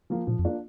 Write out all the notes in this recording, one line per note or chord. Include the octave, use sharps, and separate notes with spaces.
F3 A#3 F4
A#2 F3
F2
A#3 D4 F4